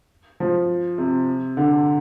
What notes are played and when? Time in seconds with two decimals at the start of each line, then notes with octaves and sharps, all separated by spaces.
0.40 F3
0.98 C3
1.57 D3